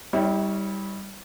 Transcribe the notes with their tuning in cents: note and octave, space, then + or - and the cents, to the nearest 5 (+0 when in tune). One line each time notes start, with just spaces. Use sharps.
G3 +5 E4 -45 C#5 +0